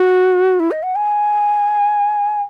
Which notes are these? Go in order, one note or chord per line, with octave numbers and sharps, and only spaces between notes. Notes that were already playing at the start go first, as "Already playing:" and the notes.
Already playing: F#4
E4
D#5
F#5
G#5